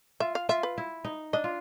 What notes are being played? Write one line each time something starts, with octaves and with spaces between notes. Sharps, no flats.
F4 E5
F5
F4 E5
B4
E4
D#4
D4 D#5
F4